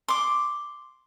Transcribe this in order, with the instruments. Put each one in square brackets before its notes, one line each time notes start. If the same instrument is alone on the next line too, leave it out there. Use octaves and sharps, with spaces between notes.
[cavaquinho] C6 D6